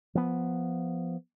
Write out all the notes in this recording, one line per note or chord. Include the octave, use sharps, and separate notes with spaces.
F3 B3